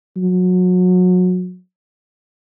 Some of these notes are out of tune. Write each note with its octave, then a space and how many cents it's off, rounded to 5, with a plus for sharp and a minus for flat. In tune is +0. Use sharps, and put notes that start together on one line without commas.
F#3 -25